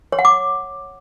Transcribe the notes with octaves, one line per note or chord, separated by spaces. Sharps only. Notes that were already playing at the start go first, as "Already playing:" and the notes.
C#5
F#5
D6